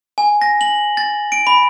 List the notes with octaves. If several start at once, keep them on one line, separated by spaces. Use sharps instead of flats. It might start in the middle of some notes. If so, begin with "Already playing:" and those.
G#5
A#6
F#7
A6
D7
B5